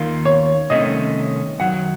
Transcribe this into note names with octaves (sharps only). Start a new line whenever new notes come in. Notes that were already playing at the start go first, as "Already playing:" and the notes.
Already playing: D#2 D#3 A#3 F4
C#5
C2 C3 D#3 A3 C#4 D#5
F#2 D#3 F#3 F#5